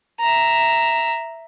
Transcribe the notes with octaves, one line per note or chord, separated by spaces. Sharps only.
E5 A#5